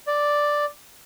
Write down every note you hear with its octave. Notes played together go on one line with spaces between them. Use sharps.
D5